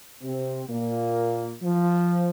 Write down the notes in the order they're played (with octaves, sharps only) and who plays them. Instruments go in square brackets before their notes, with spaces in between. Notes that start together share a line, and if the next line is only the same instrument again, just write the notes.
[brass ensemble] C3 C4
A#2 A#3
F3